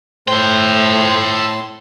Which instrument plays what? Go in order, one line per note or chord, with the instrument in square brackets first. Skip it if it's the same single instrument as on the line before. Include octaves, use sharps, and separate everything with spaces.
[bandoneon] A2 C6 [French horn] A3 [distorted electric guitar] A4 G5 [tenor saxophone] C5